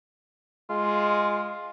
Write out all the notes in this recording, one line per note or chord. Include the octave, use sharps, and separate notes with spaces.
G#3 F4